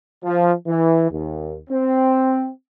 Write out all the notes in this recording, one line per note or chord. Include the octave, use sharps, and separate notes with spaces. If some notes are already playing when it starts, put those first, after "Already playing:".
F3
E3
D#2
C4